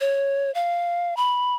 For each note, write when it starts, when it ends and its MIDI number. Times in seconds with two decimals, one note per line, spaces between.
0.01 0.53 73
0.55 1.17 77
1.17 1.56 83